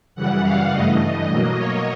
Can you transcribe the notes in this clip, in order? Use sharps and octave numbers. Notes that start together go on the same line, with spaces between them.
F#2 C#3 E3 G3 F#5
F5
G2 E3 A3 D#5
B2 F#3 A#3
C#5